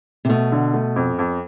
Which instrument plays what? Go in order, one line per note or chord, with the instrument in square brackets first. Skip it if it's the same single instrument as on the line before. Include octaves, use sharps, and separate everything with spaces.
[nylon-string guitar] C3
[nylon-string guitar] B2 [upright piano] A3
[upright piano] D3
A3
F2
F2